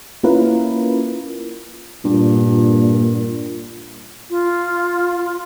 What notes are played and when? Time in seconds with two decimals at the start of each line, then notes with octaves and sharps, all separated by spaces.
0.23 A#3 C#4 E4 F4 A#4 B4
2.05 G2 A#2
4.30 F4